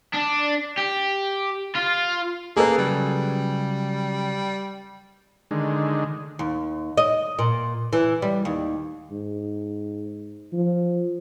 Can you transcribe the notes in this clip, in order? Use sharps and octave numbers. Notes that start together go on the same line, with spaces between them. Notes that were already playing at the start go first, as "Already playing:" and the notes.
D4
G4
F4
A#3 G#4 A4 B4
C#3 F#3 G3
D3 D#3 G#3
D#2
D#5
A#2
E3
G3
D#2
G#2
F3